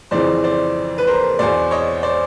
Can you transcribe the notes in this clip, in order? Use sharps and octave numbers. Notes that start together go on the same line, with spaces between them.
F2 C#3 E3 C5 D5
C5 D5
B4
A#4 C5
E2 B2 C5 D5
C#5 D#5
C5 D5